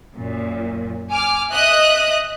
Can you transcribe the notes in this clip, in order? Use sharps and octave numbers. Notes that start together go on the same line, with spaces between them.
F#2 A#2
G#5 D6 F6
D#5 E5 D#6 F#6